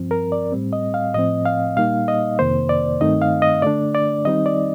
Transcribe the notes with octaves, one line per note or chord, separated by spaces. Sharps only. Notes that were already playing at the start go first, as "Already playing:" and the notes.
Already playing: G2 F3 C4
A#4
D5
A2 G3 C4
D#5
F5
A2 F3 C4 D#5
F5
A#2 G3 A#3 D#4 F5
D#5
F2 C3 D#3 A#3 C5
D5
G2 D#3 A3 C4 D#4 D#5
F5
D#5
D3 A3 D4 D5
D5
D#3 G3 C4 D#4 D#5
D5